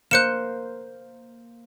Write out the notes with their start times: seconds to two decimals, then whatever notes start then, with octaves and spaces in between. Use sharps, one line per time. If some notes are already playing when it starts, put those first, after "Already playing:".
0.11 A#3 C5 F#6 C#7 E7